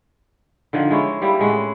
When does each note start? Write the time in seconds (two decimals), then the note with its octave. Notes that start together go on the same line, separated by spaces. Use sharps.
0.73 D3 D#3 F3
0.91 G#3 E4 C#5
1.22 G3 A#3 E4 G4
1.39 A2 G#3 C#4 F#5